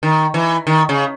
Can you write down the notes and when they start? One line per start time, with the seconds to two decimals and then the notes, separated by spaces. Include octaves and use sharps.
0.03 D#3
0.34 E3
0.67 D#3
0.89 C#3